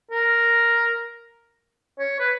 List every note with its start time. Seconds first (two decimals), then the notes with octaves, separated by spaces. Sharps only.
0.11 A#4
1.99 C#5
2.20 B4